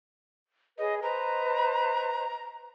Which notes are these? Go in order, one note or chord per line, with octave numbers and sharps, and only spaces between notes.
G#4 B4 C#5 D#5
B4 C5 D#5 A#5